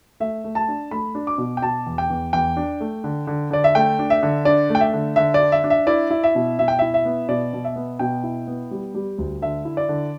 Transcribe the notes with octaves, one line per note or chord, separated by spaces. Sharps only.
A3 E5
A3
A5
D4
A3 B5
D4
D6
B2
G5
B2 A5
E2
G5
E2
E2 G5
D4
A3
D3
D3
D3 D5
E5
A3 G5
D4
E5
D3
D4 D5
A3
G5
E5
D3
D3 E5
D5
D4
E5
D4
E5
E4 D5
E4
E5
B2
B2 E5
G5
E4 E5
E5
B3
B2 D5
B2
E5
B3
B2 G5
E4
B3
G3
G3
D2
D3 E5
E4
D5
D3